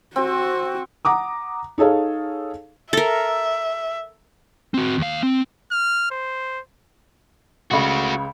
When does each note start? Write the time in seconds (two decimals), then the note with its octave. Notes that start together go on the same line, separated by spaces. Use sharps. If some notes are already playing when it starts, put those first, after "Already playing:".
0.16 C4 F#4
1.05 F#5 A#5 D6 D#6
1.78 D#4 G#4 A4 C#5 F5
2.93 A4 A#4 E5
4.74 C4 F#4
4.98 D#2 F5
5.23 C4
5.72 F6
6.11 C5
7.71 C#2 C#3 A3 F#4